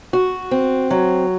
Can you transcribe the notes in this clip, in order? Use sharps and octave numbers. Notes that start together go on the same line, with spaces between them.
F#4
C4
F#3